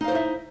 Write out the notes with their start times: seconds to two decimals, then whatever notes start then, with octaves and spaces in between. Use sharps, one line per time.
0.01 D#4
0.04 F5
0.08 C5
0.12 E4
0.15 E5